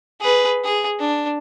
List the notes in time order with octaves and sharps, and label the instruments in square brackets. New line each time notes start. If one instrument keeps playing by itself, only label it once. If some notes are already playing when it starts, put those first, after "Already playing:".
[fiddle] G#4 B4
G#4
D4